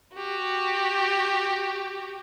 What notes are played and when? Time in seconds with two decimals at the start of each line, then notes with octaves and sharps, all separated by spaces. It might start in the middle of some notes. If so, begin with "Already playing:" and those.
0.15 F#4 G4